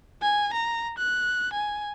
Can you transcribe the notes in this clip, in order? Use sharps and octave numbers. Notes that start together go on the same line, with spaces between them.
G#5
A#5
F#6
G#5